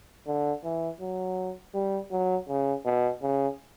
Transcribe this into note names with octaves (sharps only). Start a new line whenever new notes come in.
D3
E3
F#3
G3
F#3
C#3
B2
C#3